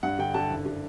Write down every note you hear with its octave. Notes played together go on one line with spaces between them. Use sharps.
G2 F#5
D3 G5
D3 A5
F#1
D3